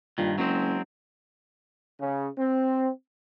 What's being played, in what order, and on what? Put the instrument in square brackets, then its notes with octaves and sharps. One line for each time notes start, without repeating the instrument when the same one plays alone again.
[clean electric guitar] G2 D#3 [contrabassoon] A#2
[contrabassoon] F#1 [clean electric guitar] F#3 G#3 C4
[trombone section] C#3
C4